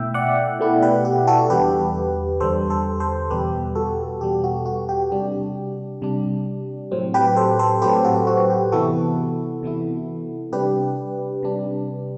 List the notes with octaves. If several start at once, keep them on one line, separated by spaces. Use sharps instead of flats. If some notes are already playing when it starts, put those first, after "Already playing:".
Already playing: B2 A3 E4 E5 G5
D5 F#5
B2 A3 E4
G4 B4
G4
F#4 A4
E2 D3 G3 G4 B4
E2 D3 G3 A4 C5
A4 C5
A4 C5
E2 B2 G3 G4 B4
F#4 A4
E2 B2 G3 G4
F#4
F#4
G4
C3 G3 D4
C3 G3 D4
A2 F#3 C4
G4 B4
A4 C5
A4 C5
A2 F#3 C4 G4 B4
F#4 A4
F#4
G4
C3 E3 B3 E4 F#4 A4
C3 E3 B3 E4
C3 G3 D4 G4 B4
C3 G3 D4